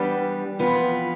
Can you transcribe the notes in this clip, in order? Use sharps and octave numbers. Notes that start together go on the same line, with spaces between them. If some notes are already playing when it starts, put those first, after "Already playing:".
Already playing: E3 G3 B3 D4 G4
F2 E3 B3 F4